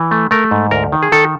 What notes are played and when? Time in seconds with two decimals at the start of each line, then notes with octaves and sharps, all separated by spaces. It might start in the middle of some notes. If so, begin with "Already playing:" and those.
Already playing: E3
0.11 A3
0.31 A3 A#4
0.51 G#2
0.71 D2 A#4
0.92 D#3
1.03 G#4
1.12 D#3 A4